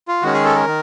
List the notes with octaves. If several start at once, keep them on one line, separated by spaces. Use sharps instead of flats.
F4
D#3 G#3 C#4 F#4
G#4
A4
A#4
D#3